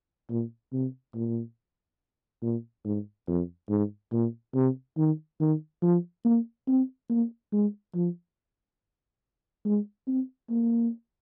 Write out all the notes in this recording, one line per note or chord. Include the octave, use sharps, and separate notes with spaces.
A#2
C3
A#2
A#2
G#2
F2
G#2
A#2
C3
D#3
D#3
F3
A#3
C4
A#3
G#3
F3
G#3
C4
A#3